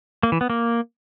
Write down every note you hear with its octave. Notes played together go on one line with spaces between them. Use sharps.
A#3
E3
B3
A#3